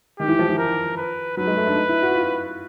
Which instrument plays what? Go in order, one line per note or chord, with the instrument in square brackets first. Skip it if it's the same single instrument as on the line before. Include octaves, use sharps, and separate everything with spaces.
[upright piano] D#3 [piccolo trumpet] G4
[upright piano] E3
F3
E3
[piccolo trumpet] A#4
B4
[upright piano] F#3 [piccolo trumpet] B4
[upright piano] G#3
A3
D4
D#4
E4
F#4
F4